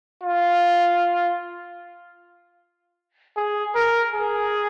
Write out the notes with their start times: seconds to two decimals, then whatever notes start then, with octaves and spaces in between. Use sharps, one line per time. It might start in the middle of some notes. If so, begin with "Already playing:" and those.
0.23 F4
3.36 G#4
3.75 A#4
4.14 G#4